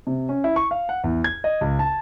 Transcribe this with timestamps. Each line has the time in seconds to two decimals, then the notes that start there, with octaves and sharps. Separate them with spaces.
0.07 C3
0.29 C#4
0.44 E4
0.56 C#6
0.71 F5
0.89 F#5
1.04 E2
1.24 G#6
1.44 D#5
1.61 C#2
1.79 A5